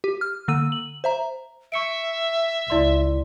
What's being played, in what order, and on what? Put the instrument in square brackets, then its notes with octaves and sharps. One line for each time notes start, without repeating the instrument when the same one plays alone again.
[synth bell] G4
F6
D3 A#3 E6 D#7
F#7
C5 E5 A#5
[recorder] E5 [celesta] C#6 C#7 D7
[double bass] C#2 [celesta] E4 D5 C6